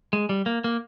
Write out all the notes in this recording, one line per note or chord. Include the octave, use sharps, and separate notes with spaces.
G#3
G3
A#3
A#3